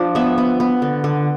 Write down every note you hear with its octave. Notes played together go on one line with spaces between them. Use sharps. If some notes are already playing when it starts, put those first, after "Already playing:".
Already playing: F3 D4
B3 E5
B3
B3
D3
D3